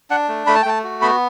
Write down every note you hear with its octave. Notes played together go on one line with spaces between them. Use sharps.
D4 F#5
A3
A3 B5
A5
G5
A3 A5
F#4
B3 B5